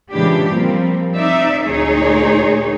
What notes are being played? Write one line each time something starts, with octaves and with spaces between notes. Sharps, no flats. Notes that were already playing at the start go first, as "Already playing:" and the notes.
A#2 C#3 E3 G#3 D4 G4
F3 G3 A#3 C4
C4 D#4 D5 E5
D2 A#2 D#4 G#4 C#5